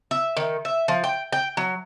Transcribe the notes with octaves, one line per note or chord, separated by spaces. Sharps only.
E5
D#3
E5
F3
G5
G5
F#3